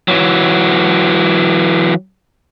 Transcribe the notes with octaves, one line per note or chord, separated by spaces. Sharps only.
E3 F#3